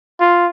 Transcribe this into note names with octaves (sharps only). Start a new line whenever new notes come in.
F4